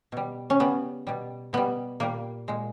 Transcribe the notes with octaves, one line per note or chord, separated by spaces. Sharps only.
B2 G3
C#4
C#3 G3 B3
B2 G3
B2 G3 B3
A#2 G3 A#3
A#2 G#3